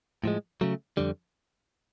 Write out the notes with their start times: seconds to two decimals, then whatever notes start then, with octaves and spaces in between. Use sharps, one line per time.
0.24 A2 F3 G#3
0.61 C#3 F#3 A3
0.97 F2 D3 G3